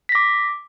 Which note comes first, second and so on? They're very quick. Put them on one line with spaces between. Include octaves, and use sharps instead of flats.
B6 A#6 D6